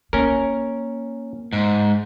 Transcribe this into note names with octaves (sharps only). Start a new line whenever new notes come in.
A#3 C#4 A#4
G#2